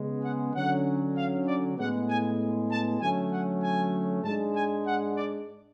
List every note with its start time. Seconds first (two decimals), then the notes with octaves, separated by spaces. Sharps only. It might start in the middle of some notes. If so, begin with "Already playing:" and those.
Already playing: C#3 G#3 B3
0.23 F#5
0.55 D3 F#3 C#4 F#5
1.16 F5
1.47 D5
1.78 A2 G#3 B3 F#5
2.08 G#5
2.70 A5
3.00 D3 F#3 A3 C#4 G#5
3.32 F#5
3.62 G#5
4.24 G#2 G#3 D4 A5
4.54 G#5
4.86 F#5
5.16 D5